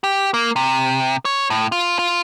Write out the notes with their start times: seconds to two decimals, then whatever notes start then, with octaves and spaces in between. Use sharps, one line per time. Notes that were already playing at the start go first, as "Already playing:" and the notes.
0.04 G4
0.34 A#3
0.56 C3
1.25 C#5
1.50 A2
1.72 F4
1.99 F4